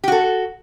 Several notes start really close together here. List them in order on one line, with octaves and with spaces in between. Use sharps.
G4 F#4 A4